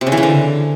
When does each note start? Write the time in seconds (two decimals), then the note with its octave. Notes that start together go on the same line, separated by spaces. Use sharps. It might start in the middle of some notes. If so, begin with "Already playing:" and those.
0.01 C3
0.07 C#3
0.12 E3
0.17 C#3
0.23 D3